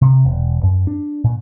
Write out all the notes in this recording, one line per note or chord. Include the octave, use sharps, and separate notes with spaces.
C3
E1
F#2
D4
A#2